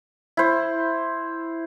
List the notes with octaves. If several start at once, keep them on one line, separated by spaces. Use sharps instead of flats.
E4 C5